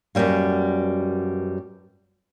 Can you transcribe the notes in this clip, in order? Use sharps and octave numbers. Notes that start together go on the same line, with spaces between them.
F#2 B2 D#3 G3 A#3